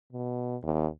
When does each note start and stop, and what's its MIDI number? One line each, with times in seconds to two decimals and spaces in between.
0.13 0.56 47
0.63 0.86 39